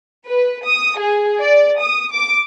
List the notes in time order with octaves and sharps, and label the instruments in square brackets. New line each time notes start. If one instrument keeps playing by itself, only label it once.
[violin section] B4
D#6
G#4
D5
D#6
D6